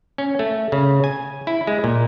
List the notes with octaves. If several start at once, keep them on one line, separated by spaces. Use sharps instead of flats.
C#4
A3
C#3
G#5
E4
G#3
A#2